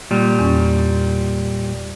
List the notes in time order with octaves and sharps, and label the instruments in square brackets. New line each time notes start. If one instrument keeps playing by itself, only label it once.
[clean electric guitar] A#2 G3
[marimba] E2 C#4 C#6